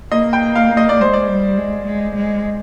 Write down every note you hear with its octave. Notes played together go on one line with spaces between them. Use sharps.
A#3 D#5
G5
F5
D#5
D5
G#3 C5
D5
G3
G#3
G#3
G#3